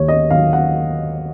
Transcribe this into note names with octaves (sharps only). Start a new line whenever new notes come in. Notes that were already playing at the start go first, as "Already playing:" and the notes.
Already playing: D#2 D#3 C#5
D#5
D#3 F#3 F5
F#5